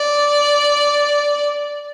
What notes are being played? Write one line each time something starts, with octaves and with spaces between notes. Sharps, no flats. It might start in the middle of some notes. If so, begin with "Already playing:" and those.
Already playing: D5